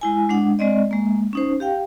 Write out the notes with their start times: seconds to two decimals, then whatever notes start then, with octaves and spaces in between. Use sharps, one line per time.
0.01 G#3 E4 G#5
0.30 G#3 D4 F#5
0.59 G#3 C4 D5 D#5
0.91 G#3 A#3
1.33 C#4 D#4 C5
1.60 G4 F5 G5